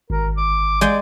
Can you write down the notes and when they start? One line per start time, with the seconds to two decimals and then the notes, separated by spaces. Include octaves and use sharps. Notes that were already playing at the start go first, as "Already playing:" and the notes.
0.10 G#1 A#4
0.37 D6
0.81 G#3 D5 G5